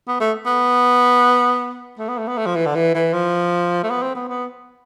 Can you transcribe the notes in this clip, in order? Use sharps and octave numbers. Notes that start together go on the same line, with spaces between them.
B3
A3
B3
A3
B3
A3
B3
A3
F3
E3
D3
E3
E3
F3
A3
B3
C4
B3
B3